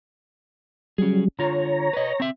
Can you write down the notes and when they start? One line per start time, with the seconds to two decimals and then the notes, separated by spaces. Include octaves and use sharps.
0.98 F#3 G3 C#4 G#4
1.39 D3 F4 C#5 A#5
1.93 B4 D#5
2.20 C4 E5